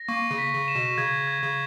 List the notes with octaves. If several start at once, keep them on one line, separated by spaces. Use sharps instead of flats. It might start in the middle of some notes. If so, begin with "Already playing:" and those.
Already playing: A#6
A#3 C#6
C#3
B6
C#3
E7
B2
C#3 G#6
G#6
C#3